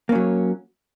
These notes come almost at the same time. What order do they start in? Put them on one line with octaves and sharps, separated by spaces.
A#3 C#4 F#3